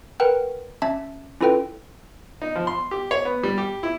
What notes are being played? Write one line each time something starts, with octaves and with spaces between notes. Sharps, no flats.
A#4 B4 F#5 G5 F#6
C#4 E5 A5
C#4 E4 F4 A4 B4 G5
D#4
F3
C6
G4
C#5
B3
G3
G4
E4